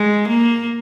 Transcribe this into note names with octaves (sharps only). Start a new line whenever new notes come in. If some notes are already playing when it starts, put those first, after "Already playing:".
Already playing: G#3
A#3